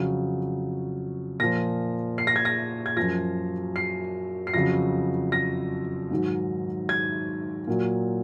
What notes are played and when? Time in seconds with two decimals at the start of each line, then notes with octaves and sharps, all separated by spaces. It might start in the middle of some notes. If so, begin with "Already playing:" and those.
Already playing: F2 C#3 F#3
1.40 A#2 F3 A#6
2.18 C7
2.27 A#6
2.36 G#6
2.45 A#6
2.86 G#6
2.97 F#2 F3 A#6
3.76 C7
4.47 C7
4.54 F2 C#3 F#3 A#6
5.32 A#6
6.11 G#2 D#3 F#3
6.89 G#6
7.67 A#2 F#3